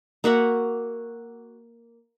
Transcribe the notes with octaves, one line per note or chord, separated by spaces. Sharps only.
A#3 F#4 E5 F#5